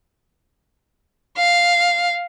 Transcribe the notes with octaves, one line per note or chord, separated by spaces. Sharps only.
F5